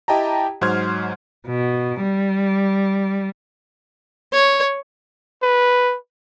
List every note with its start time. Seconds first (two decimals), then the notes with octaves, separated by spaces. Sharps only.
0.08 E4 G4 D#5 G5 A5 A#5
0.61 G#2 F#3 C5 C6 F6 G#6
1.48 B2
2.02 G3
4.33 C#5
5.43 B4